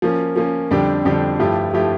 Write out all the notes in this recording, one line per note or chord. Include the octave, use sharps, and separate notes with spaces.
F3 A#3 C#4
F3 A#3 C#4
F2 D3 G3 D4 G4
F2 D3 G3 D4 G4
G2 F3 A3 E4 G4
F3 A3 E4 G4